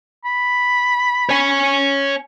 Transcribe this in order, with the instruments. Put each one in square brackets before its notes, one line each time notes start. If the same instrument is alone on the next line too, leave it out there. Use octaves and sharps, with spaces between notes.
[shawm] B5
[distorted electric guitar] C#5 G#5